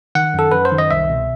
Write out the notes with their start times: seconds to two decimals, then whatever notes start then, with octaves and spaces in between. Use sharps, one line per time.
0.15 D#3 F#5
0.34 F#2 A4
0.52 F#2 B4
0.65 C5
0.72 D#3
0.78 D#5
0.91 C2 E5
1.09 B2